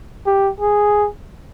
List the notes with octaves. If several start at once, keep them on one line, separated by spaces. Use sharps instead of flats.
G4
G#4